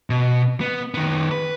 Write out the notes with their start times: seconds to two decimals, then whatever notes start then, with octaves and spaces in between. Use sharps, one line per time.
0.10 B2
0.61 B3
0.94 D#3 B3
1.31 B4